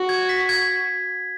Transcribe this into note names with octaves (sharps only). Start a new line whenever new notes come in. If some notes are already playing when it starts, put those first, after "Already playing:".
Already playing: F#4
G#6
B6
G#6